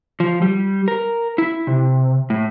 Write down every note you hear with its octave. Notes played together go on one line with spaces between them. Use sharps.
F3
G3
A#4
E4
C3
A2